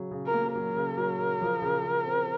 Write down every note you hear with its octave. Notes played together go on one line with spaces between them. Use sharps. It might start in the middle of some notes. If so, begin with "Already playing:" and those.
Already playing: C#3 F#3
C#3
A#4
A#3
F#3 A#4
C#3
F#3
C#3
F3
C#3
C#3
C4